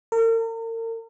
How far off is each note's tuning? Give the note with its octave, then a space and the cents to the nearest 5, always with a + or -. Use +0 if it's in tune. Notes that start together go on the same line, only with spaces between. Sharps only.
A#4 -40